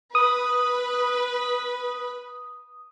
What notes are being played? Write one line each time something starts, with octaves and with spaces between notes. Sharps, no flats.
B4 D#6